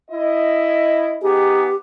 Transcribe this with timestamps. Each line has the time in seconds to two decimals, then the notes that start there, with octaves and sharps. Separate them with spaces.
0.10 E4 D#5
1.22 B3 D#4 G4 G#4